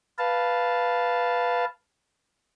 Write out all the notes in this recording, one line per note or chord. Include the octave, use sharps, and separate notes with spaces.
B4 F5 A5